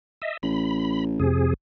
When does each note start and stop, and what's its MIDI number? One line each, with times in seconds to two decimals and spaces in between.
0.22 0.37 75
0.22 0.37 76
0.43 1.24 33
0.43 1.04 83
1.20 1.54 41
1.20 1.54 48
1.20 1.54 68